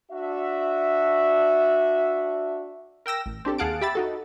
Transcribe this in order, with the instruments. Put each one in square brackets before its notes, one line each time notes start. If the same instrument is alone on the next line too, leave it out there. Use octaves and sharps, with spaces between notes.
[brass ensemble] D4 F#4 E5
[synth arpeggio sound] A#4 G5 E6 A#6
A1
C4 D4 G4 A4
D#2 G#4 F5 F#5 A5 D7
G4 E5 B5 E6 A6
D#4 F#4 A4